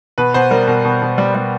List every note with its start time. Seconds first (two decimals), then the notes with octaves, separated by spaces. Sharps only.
0.18 B2 B4
0.34 B2 C5
0.51 G3 A#4
0.67 B2 A#4
0.85 B2
1.02 B2
1.18 G3
1.35 G3